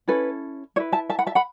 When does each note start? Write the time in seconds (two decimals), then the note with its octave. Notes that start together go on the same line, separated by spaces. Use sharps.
0.08 C#4 E4 A4 B4
0.76 E4 B4 C#5
0.92 E5 A5
1.09 E5 A5
1.19 F#5 B5
1.26 E5 A5
1.35 F#5 B5